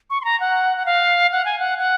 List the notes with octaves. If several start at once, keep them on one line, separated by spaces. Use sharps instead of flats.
C#6
C6
A#5
F#5
F#5
F5
F#5
G#5
F#5
F#5